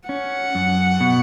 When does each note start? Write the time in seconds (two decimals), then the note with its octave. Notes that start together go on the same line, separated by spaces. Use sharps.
0.09 C#4 F#5
0.55 F#2
1.01 B2